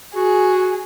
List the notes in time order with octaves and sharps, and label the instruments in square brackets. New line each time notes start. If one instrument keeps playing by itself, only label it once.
[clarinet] F#4 [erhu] G#4